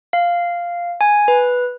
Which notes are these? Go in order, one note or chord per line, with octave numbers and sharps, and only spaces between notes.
F5
G#5
B4